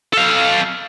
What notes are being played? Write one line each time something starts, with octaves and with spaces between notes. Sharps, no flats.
A4 F5